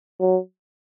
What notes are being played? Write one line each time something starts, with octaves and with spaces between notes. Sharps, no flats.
F#3